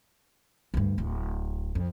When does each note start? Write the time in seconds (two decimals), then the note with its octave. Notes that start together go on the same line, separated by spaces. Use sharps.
0.74 D2 G2
0.98 D1
1.75 F2